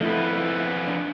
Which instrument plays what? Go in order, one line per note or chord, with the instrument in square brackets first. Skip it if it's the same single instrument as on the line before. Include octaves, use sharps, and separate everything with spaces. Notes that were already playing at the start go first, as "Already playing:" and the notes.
[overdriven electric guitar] F2 B3 [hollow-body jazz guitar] A3 E4 F4
[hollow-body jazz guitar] D4